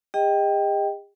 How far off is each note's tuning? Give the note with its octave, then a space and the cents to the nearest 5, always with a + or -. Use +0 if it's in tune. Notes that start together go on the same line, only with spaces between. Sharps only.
G#4 -45 D#5 +0 G5 +0